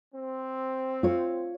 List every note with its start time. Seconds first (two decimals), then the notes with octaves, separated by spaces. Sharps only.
0.13 C4
1.03 F4 C#5